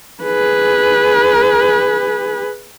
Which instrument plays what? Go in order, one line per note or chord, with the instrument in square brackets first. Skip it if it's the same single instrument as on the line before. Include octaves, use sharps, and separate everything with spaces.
[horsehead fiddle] G#4 B4